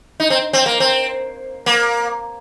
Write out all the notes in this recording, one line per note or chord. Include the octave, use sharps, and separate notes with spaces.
D#4
C4
C4
A#3
C4
A#3